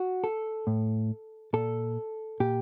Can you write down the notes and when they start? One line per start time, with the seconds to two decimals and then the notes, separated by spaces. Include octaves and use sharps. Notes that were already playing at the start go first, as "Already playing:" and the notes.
Already playing: F#4
0.24 A4
0.67 A2
1.53 A#2 A4
2.40 A#2 G4